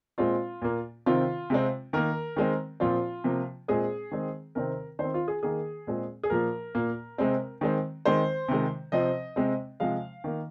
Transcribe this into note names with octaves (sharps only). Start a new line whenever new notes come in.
A#2 G#3 C4 F4
A#2 A#3
C3 D#3 C4 F4
C3 G#3 C4
D#3 A#3 A#4
D#3 G#3 C4
A#2 F3 C4 F4
C3 F3 A#3
A#2 G#3 C4 G#4
D#3 G#3 C4
C3 D#3 C4 A#4
D#3 C4 C5
F4
G#4
D#3 A#3 G#4
A#2 G#3 C4
G#4
A#2 F3 A#3 A#4
A#2 A#3
C3 G#3 C4
D#3 G#3 C4
D#3 G#3 C4 C5
C3 D#3 G#3
C3 F3 C4 D#5
C3 G#3 C4
C3 F3 G#3 F5
D#3 A#3